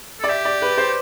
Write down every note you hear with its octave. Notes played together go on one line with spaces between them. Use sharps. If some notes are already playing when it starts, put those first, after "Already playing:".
A4 D5
G4 E5
D5
B4
C5